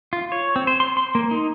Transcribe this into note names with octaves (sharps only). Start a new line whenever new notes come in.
F4
C#5
C4
C5
C6
C6
A#3
D#4